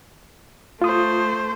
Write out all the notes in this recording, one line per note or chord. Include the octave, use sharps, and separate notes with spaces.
A3 F4 C5 D#6